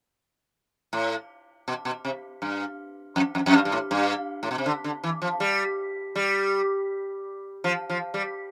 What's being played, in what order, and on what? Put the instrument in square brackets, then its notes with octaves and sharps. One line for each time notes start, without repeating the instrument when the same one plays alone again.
[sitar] A2
B2
B2
C3
G2
F2
F2
F2
G2
G2
A2
G2
A2
B2
C3
D3
D3
E3
F3
G3
G3
F3
F3
G3